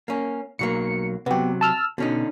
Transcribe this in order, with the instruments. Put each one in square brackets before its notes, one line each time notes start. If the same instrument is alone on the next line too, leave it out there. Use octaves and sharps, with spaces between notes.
[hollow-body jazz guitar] A#3 C#4
[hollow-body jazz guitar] B1 F#3 A#3 [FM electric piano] C#7
[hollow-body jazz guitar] C3 F#3 [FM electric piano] B3 G4
[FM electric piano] A5 E6 F6
[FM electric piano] B2 [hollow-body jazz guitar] D3 C#4 D#4